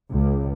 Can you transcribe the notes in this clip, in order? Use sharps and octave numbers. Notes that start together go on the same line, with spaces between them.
C#2